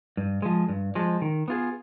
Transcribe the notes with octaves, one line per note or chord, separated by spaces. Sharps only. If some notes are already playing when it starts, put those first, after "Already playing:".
G2
F3 G#3
G2
F3 G#3
D#3
B3 F4 G#4